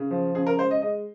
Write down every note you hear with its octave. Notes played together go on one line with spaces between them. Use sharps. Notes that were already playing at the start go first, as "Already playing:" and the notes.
Already playing: C#3
F3
C#3 G#4
A#4
G#3 C5
D#5
G#3 D#5